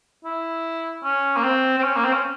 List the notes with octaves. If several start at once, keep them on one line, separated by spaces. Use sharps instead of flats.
E4
C#4
A#3
C4
C4
C#4
A#3
C4
C#4